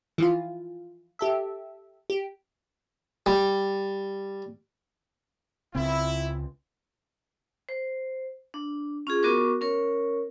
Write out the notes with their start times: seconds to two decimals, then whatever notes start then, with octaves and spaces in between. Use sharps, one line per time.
0.18 E3 F3 F4
1.19 G4 A4 E5
2.10 G4
3.26 G3
5.75 C#2 C#3 C4 E4
7.69 C5
8.54 D4
9.07 C#4 F4 G#4
9.23 B3 F#4 A#4 C#6 D6
9.61 C#4 A#4 C#5